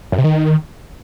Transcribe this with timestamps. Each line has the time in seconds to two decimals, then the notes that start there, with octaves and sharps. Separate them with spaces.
0.12 F#2
0.18 C3
0.24 D#3